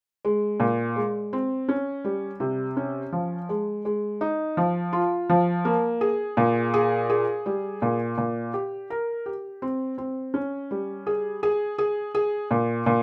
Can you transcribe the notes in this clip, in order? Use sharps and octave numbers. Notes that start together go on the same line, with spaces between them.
G#3
A#2
G#3
C4
C#4
G3
C3
C#4
F3
G#3
G#3
D#4
F3
F4
F3
A#3
G#4
A#2
G#4
G#4
G3
A#2
A#2
G4
A#4
G4
C4
C4
C#4
G3
G#4
G#4
G#4
G#4
A#2
A#2